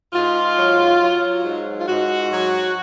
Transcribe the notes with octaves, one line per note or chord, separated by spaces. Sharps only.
G#2 F4
F#3
F#3
G#2
F4
G#2 F#4
F#3